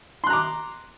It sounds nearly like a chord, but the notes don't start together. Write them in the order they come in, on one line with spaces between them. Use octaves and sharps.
C6 F#6 A#5 D6